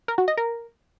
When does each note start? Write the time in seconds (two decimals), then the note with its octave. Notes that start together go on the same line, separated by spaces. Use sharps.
0.08 A#4
0.18 F#4
0.28 D#5
0.37 A#4